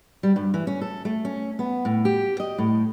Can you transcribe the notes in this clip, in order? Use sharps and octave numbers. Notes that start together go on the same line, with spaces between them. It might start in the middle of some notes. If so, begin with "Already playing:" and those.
G3
G2
E3
C#4
A4
A3
C#4
B3
A2
G4
D#5
A2